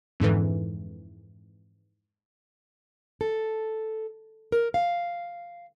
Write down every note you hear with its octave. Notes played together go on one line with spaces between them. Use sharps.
F2 G#2 D3 E3
A4
A#4
F5